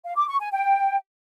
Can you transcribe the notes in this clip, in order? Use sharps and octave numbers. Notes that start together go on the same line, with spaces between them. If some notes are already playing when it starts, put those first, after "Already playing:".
F5
D6
C#6
G#5
G5